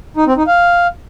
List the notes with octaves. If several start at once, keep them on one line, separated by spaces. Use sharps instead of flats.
D#4
C4
D#4
F5